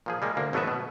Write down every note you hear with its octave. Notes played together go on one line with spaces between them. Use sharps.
A#2 F3 G#4
G3 G#3 A#3
D2 A#3
G#1 F#3 A3 B3 B4 E5
B2